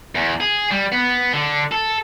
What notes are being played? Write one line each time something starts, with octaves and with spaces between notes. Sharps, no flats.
E2
G#4
G3
B3
D3
A4